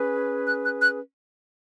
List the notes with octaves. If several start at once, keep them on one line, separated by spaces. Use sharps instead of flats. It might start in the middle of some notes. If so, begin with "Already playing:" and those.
Already playing: C#4 G#4 B4
F#6
F#6
F#6